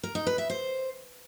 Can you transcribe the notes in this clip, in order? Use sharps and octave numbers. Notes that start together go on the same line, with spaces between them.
A#4
D#4
B4
E5
C5